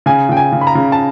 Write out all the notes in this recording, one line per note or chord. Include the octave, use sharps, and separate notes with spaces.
C#3 G#5
C#3 G5
G#5
C#3
B5
A#5
C#3
A5